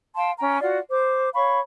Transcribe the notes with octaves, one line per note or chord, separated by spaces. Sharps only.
F5 G5 A5 C6
C#4 G5 A#5
F4 F#4 D5 F#5
C5 D6
C#5 F5 B5 C#6